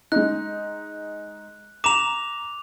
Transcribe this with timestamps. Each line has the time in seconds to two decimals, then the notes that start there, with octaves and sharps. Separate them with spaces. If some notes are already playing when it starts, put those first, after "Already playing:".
0.12 G#3 D#4 F#6
1.84 A#5 D6 E7 F7